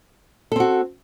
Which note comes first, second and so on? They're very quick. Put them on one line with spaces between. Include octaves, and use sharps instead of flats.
A4 C4 F#4